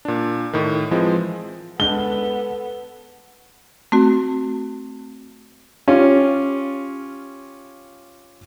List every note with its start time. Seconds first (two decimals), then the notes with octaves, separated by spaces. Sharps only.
0.05 A#2 D4
0.53 A2 D#3
0.91 E3 F3 G#3 C4
1.80 G#3 B3 D4 A4 G7
3.92 A3 C4 F#4
5.88 C#4 F4 G4